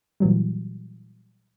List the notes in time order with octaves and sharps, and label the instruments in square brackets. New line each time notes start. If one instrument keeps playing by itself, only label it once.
[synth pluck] A#2 E3 F#3 G3